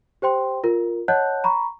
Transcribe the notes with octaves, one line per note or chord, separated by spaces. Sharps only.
G4 C5 G5 C6
F4 A#4
C#5 D#5 F#5 A5 F#6 G6
A#5 B5 C#6